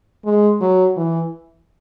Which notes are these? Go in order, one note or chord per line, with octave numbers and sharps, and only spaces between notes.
G#3
F#3
E3